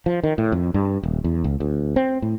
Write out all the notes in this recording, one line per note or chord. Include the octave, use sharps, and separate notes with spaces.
F3
D#3
A2
F2
G2
D#1
E2
C#2
D2
C4
A2